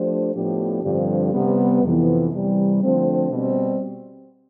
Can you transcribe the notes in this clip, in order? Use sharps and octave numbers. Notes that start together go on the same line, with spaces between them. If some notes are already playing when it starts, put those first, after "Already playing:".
Already playing: F3 A3 D4 G4 C5
A2 F3 B3 D4 G4
G2 D3 F3 C4 G4
C3 G3 B3
F2 C3 E3 B3
C3 E3 G3
D3 F3 A3 C4
B2 G3 C4